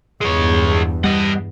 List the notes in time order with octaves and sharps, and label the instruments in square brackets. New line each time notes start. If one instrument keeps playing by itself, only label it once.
[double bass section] E2 G2 [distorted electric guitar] G#3 C#5
[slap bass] G3 [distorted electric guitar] D#5 F#5